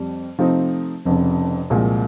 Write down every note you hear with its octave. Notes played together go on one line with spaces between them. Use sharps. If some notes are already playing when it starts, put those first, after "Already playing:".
Already playing: F2 G3
C3 F3 A3 C4 D#4
F1 F2 C#3
C2 A#2 F3 G#3